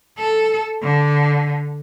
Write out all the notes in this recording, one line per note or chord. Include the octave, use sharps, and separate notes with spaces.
A4
D3